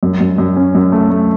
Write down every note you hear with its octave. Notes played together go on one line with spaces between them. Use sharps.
F#2
F#2
F#2
C#4
F#2
A3
A3